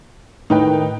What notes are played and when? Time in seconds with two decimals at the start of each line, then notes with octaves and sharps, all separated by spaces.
0.50 A2 D#3 D#4 B4 G5